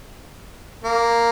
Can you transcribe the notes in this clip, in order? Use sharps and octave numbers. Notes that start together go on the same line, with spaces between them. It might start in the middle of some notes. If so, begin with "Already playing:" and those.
A#3